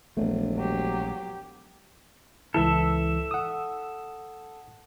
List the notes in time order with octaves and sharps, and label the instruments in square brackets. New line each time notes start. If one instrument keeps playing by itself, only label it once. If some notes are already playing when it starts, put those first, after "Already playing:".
[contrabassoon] E1 [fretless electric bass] A#1 A3
[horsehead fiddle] F#3 G4
[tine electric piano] C#2 E3 E4 [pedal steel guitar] A4 E5
[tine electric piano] F#5 D#6